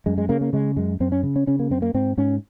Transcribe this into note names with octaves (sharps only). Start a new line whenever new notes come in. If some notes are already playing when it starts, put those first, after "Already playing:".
F#2 G#3
G#3
C#3 A#3
A#3
C#3 G#3
F#2 G#3
F#2 C4
C#4
C#3
C#4
C#3 C#4
A#3
F#2 C4
A#3
G#2 C4
G#2 C#4